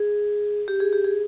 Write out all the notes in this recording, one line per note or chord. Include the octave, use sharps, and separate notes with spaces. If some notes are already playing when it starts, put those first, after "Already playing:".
Already playing: G#4
G4
G#4
G4
G#4